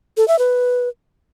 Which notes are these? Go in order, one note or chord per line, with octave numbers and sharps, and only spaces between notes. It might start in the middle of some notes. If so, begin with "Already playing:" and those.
A4
E5
B4